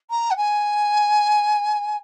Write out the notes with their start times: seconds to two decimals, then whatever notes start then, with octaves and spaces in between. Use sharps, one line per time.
0.10 A#5
0.30 F#5
0.36 G#5